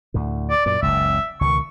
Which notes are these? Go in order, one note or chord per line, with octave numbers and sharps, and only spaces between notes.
D2 A2 D3
D5
F#2 A#2 D5
F#1 C#2 E5
C#2 B2 D#3 C#6